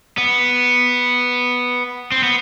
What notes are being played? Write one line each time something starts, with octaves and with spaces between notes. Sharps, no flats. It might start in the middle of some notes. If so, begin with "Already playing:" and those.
B3
C4
B3